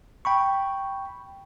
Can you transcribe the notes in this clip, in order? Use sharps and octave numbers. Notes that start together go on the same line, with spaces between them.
G5 B5 C#6